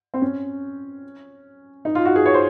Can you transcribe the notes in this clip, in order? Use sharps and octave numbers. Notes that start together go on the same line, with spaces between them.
C4
C#4
D#4
F4
F#4
G#4
C#5
C5